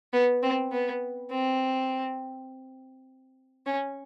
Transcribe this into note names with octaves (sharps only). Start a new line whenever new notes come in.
B3
C4
B3
C4
C#4